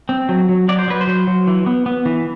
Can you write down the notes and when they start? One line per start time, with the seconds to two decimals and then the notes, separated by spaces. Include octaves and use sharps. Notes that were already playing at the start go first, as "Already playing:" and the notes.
0.09 C4
0.29 F#3
0.49 F#3
0.68 F#3 D5
0.79 C5
0.88 F#3 B4
1.01 C5
1.07 F#3
1.27 F#3
1.47 E3
1.66 B3
1.86 B3
2.05 E3